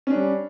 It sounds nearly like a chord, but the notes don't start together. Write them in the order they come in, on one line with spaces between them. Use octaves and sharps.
C#4 D4 G3